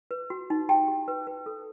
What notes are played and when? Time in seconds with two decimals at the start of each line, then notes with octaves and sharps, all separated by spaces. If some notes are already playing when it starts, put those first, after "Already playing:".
0.11 B4
0.30 F#4
0.50 D#4
0.69 G4 G5 A5
0.88 G4
1.08 B4
1.27 B4
1.46 A4